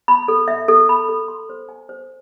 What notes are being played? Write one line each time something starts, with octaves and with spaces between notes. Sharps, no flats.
B5
A4
E5
A4
B5
A4
C6
C5
G#5
C5